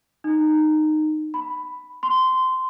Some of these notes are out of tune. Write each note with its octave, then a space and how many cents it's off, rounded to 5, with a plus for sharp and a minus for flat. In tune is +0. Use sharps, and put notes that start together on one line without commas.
D#4 -15
B5 +5
C6 -20